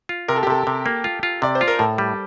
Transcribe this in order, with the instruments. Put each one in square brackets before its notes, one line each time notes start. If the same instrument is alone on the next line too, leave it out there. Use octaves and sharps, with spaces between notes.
[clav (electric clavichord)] F4
[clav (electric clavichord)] C3 [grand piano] A#4
[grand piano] A4
G4
[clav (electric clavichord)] C3 [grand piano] A4
[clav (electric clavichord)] C3
A#3
F4
F4
[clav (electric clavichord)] C3 [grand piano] D5
[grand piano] C5
[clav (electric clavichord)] F4
[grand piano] A#4
[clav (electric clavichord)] A2 [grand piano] A4
[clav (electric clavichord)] G3